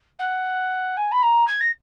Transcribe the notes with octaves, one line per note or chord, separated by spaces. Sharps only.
F#5
G#5
B5
A#5
G#6
A#6